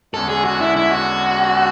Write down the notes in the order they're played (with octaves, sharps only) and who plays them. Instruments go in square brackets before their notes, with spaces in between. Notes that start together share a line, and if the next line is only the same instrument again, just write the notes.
[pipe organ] E2 D3 G#3 C#4 [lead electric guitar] A4
[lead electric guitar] G#4
F#4
E4
E4
F#4